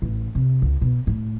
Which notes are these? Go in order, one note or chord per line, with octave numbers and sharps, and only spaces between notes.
A1
C3
C#2
B2
A2